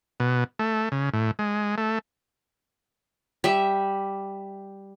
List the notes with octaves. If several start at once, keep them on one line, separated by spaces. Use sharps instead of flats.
B2
A3
C#3
A2
G#3
A3
G3 E5